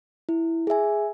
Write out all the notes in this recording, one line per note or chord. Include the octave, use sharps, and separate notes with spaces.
E4
G#4 E5 G#5